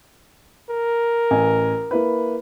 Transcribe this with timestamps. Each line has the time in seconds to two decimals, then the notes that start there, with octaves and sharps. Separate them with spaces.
0.69 A#4
1.31 A1 G#5
1.91 A#3 E4 B4